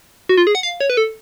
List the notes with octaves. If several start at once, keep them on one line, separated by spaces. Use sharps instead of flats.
F#4
F4
G#4
F#5
F5
C#5
B4
A4